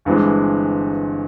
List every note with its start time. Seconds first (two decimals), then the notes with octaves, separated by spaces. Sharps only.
0.05 G1 G2 E3 G#3 C4